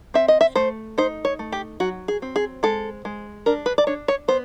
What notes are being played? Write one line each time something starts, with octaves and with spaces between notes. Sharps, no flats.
C4 E5
D#5
E5
A3 C5
D#4 C5
C#5
A3
G4
F#3 F#4
G#4
C4
G#4
G#3 A4
G#3
D4 A#4
B4
D5
D4 C#5
C#5
B3 C5